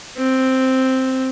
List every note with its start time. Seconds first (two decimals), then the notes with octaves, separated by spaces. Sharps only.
0.18 C4